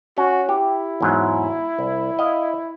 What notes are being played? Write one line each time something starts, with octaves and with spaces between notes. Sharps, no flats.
C#4 F#4
E4 G4
E2 G#2 F#3
C2
D#5 F5